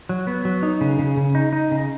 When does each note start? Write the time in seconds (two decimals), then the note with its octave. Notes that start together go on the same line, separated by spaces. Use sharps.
0.09 F#3
0.27 B3
0.45 F#3
0.63 D#4
0.81 C#3
0.99 C#3
1.17 C#3
1.35 D#4
1.53 D#4
1.71 C#3